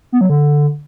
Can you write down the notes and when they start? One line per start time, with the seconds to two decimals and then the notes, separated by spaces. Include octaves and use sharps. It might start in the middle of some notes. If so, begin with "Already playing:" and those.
0.12 B3
0.21 F#3
0.30 D3